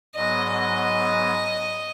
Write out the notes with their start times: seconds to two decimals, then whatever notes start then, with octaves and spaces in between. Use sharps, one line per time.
0.16 G#2 F#3 B3 D#5
0.53 D#5